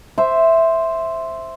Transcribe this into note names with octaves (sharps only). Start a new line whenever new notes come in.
C5 E5